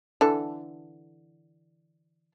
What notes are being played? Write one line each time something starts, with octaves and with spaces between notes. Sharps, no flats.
D3 E3 A4